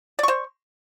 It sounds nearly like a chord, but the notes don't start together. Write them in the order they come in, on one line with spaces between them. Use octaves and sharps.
D5 C#6 C5